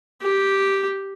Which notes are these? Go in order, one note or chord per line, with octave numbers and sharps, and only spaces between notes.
G4